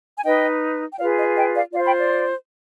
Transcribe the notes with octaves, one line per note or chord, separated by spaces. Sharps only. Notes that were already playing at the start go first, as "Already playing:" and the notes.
G#5
D#4 B4 D#5 G5
G5
F4 G#4 B4 D5 F5
D#5
D#5 G5
D5 F5
F4 C5 D5 F5
G5 B5
D5